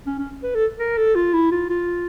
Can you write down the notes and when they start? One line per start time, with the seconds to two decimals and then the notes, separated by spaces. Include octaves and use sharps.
0.06 C#4
0.19 C#4
0.43 B4
0.55 A4
0.79 A#4
0.97 A4
1.15 F4
1.34 E4
1.52 F4
1.70 F4